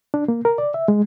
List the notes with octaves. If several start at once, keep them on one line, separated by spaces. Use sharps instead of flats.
D4
A#3
A#4
D5
E5
G#3